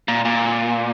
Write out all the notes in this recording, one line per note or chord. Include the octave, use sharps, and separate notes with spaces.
A#2
A#2